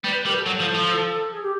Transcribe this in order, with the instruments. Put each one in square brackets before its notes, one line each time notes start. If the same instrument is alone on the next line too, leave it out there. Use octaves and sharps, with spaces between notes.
[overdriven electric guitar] G3 [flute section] B4
[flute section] B4
[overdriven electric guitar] G3 [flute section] A#4
[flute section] A4
[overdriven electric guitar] F#3
F3
F3
[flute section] G#4
G4